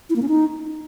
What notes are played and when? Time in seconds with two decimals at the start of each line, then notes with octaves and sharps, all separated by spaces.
0.10 E4
0.16 A#3
0.22 C#4
0.28 D#4